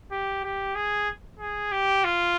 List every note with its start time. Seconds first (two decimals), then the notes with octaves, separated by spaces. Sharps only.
0.11 G4
0.44 G4
0.75 G#4
1.39 G#4
1.72 G4
2.04 F4